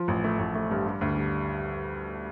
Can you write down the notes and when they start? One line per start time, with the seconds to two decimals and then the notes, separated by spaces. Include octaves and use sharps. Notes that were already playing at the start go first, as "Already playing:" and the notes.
Already playing: F3
0.08 A1
0.24 A3
0.39 A1
0.55 A3
0.71 G2
0.86 G3
1.01 D2
1.16 G3